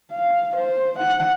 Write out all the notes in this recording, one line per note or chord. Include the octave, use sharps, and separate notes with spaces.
F5
C5
F#5